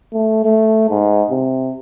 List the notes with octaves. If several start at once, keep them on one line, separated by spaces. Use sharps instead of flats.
A3
A3
G#2
C3